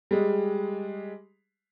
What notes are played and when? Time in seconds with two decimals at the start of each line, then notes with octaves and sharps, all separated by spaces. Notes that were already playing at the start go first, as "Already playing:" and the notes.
0.11 G3 G#3